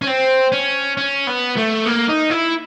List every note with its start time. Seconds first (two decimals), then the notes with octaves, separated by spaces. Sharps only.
0.02 C#4
0.07 C4
0.52 C#4
0.97 C#4
1.27 B3
1.57 A3
1.86 A#3
2.09 D#4
2.31 E4